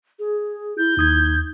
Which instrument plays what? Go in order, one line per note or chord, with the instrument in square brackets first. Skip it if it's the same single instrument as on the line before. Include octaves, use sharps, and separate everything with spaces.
[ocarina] G#4
[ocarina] E4 [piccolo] G6
[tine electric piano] D#2 D#6 G#6 [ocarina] D#4